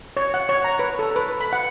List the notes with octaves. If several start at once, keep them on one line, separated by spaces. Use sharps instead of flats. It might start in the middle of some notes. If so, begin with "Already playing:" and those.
C#5
F#5
C#5
A#5
B4
A4
B4
B5
F#5